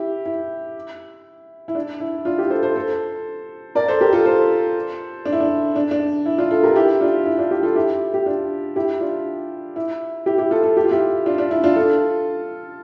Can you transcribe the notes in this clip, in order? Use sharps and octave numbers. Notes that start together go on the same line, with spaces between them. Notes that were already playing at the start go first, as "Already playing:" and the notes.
Already playing: E4 G4
E4
E4
D4
E4
D4 F4
E4 G4
A4 C5
A4 C5
A4 C5
A#4 D5
A4 C5
G4 A#4
F4 A4
A4 C5
D4
E4
D4
D4
D4
E4
D4 F4
F4 A4
G4 A#4
E4 G4
D4 F4
E4
D4 F4
E4 G4
F4 A4
E4 G4
G4
D4 F4
E4 G4
D4 F4
E4
E4 G4
E4 G4
F4 A4
F4 A4
G4
F4
E4 G4
D4 F4
D4
E4
D4 F4
F4 A4